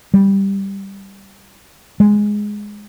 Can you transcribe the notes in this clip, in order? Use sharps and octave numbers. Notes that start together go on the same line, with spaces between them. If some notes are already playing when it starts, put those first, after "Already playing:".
G3
G#3